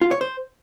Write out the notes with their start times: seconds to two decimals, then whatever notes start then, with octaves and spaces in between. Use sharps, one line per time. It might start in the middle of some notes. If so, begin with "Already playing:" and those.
0.01 F4
0.11 C#5
0.21 C5